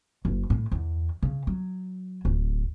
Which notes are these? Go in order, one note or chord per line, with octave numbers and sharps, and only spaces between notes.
F#1
A2
E2
C#3
F#3
D1